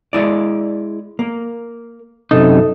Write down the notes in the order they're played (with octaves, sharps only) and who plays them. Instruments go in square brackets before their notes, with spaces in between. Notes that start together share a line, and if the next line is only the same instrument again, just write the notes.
[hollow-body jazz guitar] G#3 E4 D5
A#3
[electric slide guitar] F#2 C3 D#4 [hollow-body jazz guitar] A4